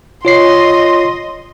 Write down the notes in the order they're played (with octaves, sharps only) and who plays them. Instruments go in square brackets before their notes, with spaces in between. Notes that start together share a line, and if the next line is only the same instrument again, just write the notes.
[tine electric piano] F4 C#5 C7 [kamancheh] D#5 C6